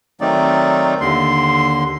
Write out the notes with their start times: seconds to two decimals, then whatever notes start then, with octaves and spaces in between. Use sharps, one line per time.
0.21 D#3 F#3 A3 C4 D#4 D5
1.01 D#2 D3 C6